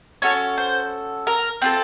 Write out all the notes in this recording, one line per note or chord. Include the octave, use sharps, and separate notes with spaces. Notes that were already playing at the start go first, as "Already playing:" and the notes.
C#4 F#4 A4 C#5
C5
A#4
C4 F4 A4